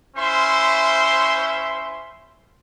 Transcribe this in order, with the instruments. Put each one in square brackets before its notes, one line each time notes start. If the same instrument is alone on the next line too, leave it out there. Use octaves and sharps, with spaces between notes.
[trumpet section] C#4 E4 C5 E5 C6